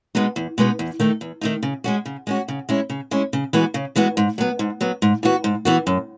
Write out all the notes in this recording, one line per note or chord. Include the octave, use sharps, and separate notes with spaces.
B2 G#3 B3 D#4
E2
B2 G#3 B3 D#4
E2
D#3 A3 D#4
E2
D#3 A3 D#4
C#3
G#3 C#4 F#4
C#3
G#3 C#4 F#4
C#3
G#3 C#4 E4
C#3
G#3 C#4 E4
C#3
E3 G#3 B3 F#4
C#3
E3 G#3 B3 F#4
G#2
F#3 B3
G#2
F#3 B3
G#2
E3 B3 F#4
G#2
E3 B3 F#4
F#2